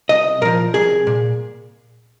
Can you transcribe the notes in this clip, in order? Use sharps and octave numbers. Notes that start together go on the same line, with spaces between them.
C2 D#5
A#2 F3 A#4
C2 G#4
A#2